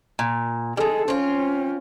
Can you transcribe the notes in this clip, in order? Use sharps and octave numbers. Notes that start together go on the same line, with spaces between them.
A#2
G3 G#3 G#4 A4
C4 C#4 F4